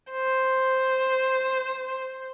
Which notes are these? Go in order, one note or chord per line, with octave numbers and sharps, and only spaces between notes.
C5